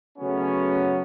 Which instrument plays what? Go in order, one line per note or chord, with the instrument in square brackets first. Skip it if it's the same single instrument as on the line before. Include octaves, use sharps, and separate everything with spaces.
[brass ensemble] C#3 F#3 A3 B3 C#4